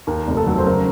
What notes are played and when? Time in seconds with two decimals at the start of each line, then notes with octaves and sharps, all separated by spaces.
0.07 D#2 A#4
0.28 F1
0.37 A4
0.47 F#3
0.58 C5
0.67 C#3 A#4